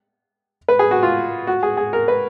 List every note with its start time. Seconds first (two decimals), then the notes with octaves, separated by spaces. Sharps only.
0.68 B4
0.79 G#4
0.91 F#4
1.03 F4
1.47 F#4
1.63 G#4
1.77 G#4
1.93 A#4
2.08 B4